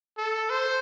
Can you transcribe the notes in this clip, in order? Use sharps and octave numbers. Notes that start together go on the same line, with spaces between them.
A4
C5